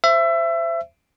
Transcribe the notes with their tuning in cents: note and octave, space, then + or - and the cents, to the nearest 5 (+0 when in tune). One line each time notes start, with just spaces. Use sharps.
C5 +0 E5 +25